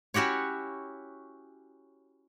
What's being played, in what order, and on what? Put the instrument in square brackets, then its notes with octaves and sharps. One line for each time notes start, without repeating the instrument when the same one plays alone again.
[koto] C#4 E4 F#4 G4 C#5